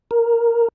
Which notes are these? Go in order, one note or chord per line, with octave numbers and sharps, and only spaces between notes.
A#4